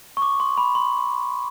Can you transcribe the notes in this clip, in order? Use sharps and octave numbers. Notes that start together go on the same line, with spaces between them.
C#6
D6
C6
B5
C6